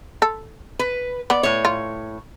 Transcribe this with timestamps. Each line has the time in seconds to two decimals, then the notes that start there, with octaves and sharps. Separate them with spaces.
0.22 A4
0.79 B4
1.30 B3 D5
1.43 A2 C#5
1.65 F4